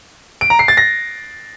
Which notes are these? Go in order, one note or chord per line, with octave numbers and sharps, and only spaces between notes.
D7
A#5
C7
A6
A#6